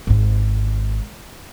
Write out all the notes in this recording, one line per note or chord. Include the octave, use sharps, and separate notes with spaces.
G#1 G#2